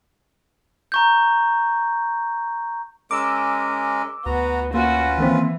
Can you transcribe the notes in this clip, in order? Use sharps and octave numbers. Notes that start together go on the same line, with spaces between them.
A#5 C#6 G6
G#3 C#4 A#4 D6 E6
D2 B3 F#4 A#5
A#3 C#4 F4 F#4 B4
D#3 E3 A#3 C4